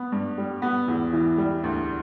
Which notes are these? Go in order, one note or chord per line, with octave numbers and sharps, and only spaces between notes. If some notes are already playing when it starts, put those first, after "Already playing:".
Already playing: B3
G2
G3
B3
E2
E3
G3
D2